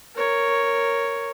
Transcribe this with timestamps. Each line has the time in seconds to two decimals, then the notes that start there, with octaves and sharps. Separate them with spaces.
0.16 A#4 C#5